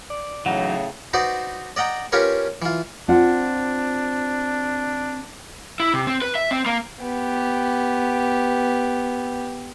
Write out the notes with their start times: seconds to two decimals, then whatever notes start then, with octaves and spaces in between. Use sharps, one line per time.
0.10 D5
0.46 A2 C#3 E3 F#3 D#4 F#5
1.13 D#4 F#4 B4 C5 D5
1.76 D5 D#5 F#5 G5 A#5
2.12 C#4 F4 G4 A#4 B4 C#5
2.62 E3 F4
3.08 C4 D4 F4 F#5
5.80 E4
5.94 C3
6.07 C4
6.22 B4
6.35 E5
6.51 C4
6.66 A#3
7.01 B3 G4